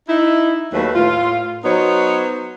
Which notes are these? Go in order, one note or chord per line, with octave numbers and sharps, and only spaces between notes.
D#4 E4
D#2 F#3 A3 B4
A2 F4
F#3 B3 D#4 C5 C#5